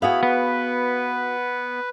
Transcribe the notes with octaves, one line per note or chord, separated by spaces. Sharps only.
B3 E4 F#4 G#4 F5 B5
B3 B4